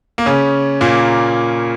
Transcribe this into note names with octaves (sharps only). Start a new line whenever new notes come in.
A#3
C#3 C#4
A#2 A#3